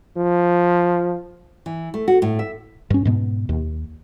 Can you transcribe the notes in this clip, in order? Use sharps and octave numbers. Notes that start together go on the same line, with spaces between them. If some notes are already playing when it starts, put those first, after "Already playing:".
F3
E3
A3
F#4
A2
E5
G2 C#4
G#2 B2 B3
D#2